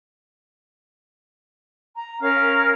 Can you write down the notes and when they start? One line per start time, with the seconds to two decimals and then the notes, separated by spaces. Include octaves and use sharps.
1.95 A#5
2.20 C#4 A#4 F5 F6